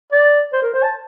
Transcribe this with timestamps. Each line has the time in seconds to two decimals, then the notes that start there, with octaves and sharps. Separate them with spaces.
0.12 D5
0.53 C5
0.62 A#4
0.74 C5
0.83 A5